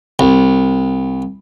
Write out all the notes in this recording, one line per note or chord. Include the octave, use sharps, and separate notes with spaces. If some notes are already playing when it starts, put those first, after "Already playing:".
C2